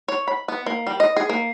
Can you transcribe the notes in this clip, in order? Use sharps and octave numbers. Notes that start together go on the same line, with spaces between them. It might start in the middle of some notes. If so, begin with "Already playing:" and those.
C#5
B5
B3
A#3
G3
D#5
G#4
A#3